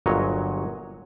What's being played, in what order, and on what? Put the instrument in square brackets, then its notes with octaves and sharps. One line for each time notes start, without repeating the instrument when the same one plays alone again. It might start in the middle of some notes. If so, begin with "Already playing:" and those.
[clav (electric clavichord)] G1 A#2 F#3 C#5 D#5